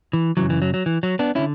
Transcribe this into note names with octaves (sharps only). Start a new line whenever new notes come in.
E3
F#2 C#3 E3 F#3
E3
F#3
F#3
E3
F#3
B3 D4
D3 C#4 E4